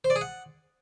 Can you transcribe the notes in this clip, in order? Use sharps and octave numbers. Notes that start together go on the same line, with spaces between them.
C5
D5
G#4
F#5